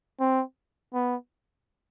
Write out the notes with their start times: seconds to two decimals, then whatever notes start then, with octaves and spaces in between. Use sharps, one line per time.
0.20 C4
0.94 B3